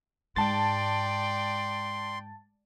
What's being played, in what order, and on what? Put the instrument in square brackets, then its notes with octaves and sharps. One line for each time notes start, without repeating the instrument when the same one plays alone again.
[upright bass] G#2 [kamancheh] D5 G5 [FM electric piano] A5 A6 [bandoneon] C6